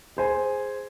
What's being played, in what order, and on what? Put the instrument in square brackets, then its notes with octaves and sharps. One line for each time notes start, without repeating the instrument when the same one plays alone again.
[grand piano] G#4 C5 G#5